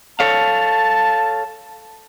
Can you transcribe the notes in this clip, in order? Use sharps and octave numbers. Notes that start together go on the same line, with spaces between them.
A4 C#5 F5 A5